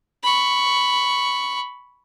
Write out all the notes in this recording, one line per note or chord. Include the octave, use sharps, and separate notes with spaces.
B5 C#6